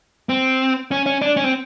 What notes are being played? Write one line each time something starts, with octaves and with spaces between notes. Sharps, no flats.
C4
C#4
C#4
D4
C#4
C4